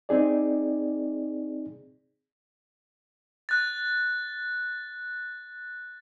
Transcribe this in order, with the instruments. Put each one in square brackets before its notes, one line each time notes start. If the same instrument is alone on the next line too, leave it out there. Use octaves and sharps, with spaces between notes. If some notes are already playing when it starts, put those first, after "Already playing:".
[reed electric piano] C4 D#4 G#4 D5
[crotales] F#6 A6